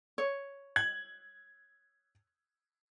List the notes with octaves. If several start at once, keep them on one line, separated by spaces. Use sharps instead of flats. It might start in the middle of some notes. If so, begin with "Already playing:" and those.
C#5
G#6 F#7